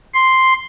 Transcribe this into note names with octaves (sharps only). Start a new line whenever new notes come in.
C6